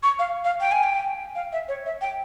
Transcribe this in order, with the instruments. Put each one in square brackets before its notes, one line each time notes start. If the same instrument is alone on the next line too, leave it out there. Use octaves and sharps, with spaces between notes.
[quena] C#6
F5
F5
G5
G#5
G5
F5
E5
C#5
E5
G5